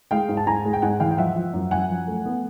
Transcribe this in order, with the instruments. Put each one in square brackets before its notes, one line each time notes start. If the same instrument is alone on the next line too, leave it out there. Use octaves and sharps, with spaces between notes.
[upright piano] G#3 F5 G5
G#2
A5
G#2 G#5 A#5
G#3
G5
G#2 F#5 G#5
E3 F5 G5
G5
F3 E5 F#5
F3
F#2
F#2 F#5 G#5
F3
A3
B3